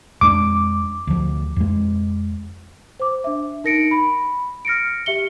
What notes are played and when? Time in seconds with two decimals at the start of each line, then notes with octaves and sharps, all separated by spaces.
0.21 F2 G#3 D4 D6
1.07 D2 F3
1.56 F2 G#3
3.00 C5 D6
3.24 D4 E5
3.64 D#4 A#4 A#6 C#7 D7
3.91 B5
4.65 F6 A#6 C#7 D7
5.06 G4 E5 C#7 G7